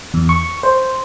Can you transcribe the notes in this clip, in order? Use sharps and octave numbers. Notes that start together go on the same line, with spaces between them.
E2
C#6
C5